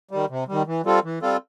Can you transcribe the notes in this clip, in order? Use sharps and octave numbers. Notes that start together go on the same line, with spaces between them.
D#3 G3
C3
D#3 G3
E3
G3 C4 F4 A4
E3
G3 C4 F4 A4